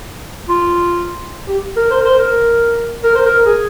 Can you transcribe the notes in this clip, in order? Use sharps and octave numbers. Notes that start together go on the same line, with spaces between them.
F4
G4
A#4
C5
A#4
C5
A#4
A#4
C5
A#4
G#4